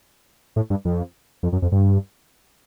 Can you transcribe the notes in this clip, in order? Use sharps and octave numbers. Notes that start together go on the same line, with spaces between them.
A2
G2
F2
F2
F#2
F2
G2